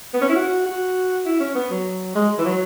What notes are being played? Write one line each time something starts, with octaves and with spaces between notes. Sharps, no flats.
B3
C#4
E4
F#4
F#4
E4
C#4
B3
F#3
G#3
E3
F#3